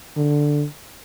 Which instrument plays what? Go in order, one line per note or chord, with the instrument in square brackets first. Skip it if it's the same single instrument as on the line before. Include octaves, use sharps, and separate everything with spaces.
[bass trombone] D3